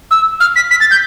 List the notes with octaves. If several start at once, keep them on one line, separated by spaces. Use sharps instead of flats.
E6
F6
B6
B6
A6
G6